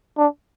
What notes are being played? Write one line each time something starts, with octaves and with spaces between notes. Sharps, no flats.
D4